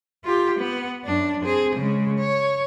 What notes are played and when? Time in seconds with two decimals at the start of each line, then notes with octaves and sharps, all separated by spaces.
0.24 F4 G4
0.59 B3
1.05 F#2 D4
1.44 C4 G#4
1.76 C#3 G#3
2.19 C#5